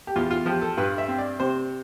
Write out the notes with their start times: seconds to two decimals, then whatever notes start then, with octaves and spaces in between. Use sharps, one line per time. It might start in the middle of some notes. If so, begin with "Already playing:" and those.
0.07 G4
0.16 E2 F4
0.31 F4
0.46 F3 G4
0.62 A4
0.77 G2 B4
0.98 E5
1.08 C4
1.18 D5
1.40 C3 C5